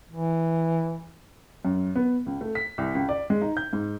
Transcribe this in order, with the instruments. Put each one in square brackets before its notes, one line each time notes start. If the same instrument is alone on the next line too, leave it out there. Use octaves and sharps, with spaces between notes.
[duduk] E3
[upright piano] F#2
B3
C#2
A3
B6
C2
C#2
D5
G#3
D#4
G6
G#2